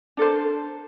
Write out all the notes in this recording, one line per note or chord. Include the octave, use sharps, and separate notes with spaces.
D4 A4 A#4 C5